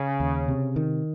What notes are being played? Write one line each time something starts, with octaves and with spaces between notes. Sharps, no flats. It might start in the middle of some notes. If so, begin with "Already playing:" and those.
Already playing: C#3
D#2
C3
D#3